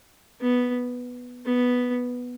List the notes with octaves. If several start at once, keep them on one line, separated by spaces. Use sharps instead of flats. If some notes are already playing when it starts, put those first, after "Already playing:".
B3
B3